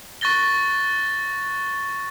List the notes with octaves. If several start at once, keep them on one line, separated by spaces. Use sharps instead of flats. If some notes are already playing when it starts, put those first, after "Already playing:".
C#6 F#6 A6 A#6 G7